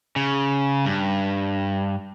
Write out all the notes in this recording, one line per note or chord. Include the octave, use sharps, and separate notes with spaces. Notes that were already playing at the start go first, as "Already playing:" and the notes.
C#3
G2